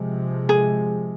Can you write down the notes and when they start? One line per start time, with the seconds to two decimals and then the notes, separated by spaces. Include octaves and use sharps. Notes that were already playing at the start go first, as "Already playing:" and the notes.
Already playing: C3 F3 G#3
0.49 G#4